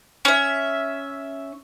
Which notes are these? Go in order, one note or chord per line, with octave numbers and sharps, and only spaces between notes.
C#4 E5